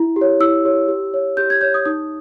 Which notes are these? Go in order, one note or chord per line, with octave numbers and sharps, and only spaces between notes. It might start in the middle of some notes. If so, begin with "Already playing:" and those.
Already playing: E4
G4
C#5
E4 E6
G4 C#5
G4
C#5
G4 G6
G#6
C#5 G6
D#6
D#4 D#6